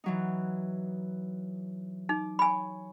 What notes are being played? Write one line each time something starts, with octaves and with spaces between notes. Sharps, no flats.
E3 F#3 D#4
D#4 D6
C#5 G#5 B5